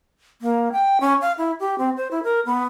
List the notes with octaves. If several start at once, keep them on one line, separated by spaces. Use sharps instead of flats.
A#3
G5
C#4
F5
E4
G4
C4
C5
E4
A#4
B3